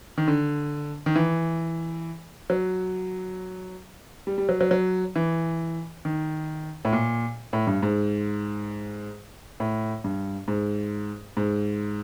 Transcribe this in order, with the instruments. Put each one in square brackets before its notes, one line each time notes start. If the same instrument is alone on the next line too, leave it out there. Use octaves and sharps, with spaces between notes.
[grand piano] D#3
D3
D#3
E3
F#3
G3
G3
F#3
F#3
F#3
E3
D#3
A2
A#2
A2
G2
G#2
A2
G2
G#2
G#2